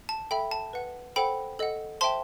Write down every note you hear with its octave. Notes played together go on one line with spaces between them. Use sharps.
A5
A4 E5 G5 B5
A5
B4 F#5
A4 C5 F#5 G5 B5
A4 D#5 F#5
C5 E5 G5 A5 C6